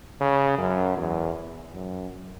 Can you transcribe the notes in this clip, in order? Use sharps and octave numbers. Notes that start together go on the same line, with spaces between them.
C#3
F#2
E2
F#2